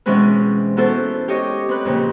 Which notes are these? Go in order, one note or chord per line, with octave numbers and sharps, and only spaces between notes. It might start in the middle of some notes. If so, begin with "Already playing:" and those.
B2 E3 G#3 C4 C#4 B4
B3 C#4 E4 F#4 A4 C5
G4 C#5 D#5
C4 B4
F2 A#2 C#3